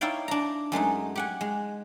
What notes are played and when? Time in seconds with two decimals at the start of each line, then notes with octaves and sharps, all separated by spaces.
0.01 D#4 E4 C#5 D5 F5 G5
0.28 D4 A#5
0.72 F#2 G#3 A3 D#4
1.16 G4 F#5 G#5
1.41 G#3